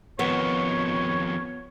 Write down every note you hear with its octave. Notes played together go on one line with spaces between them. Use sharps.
F2 D#3 B3 C#5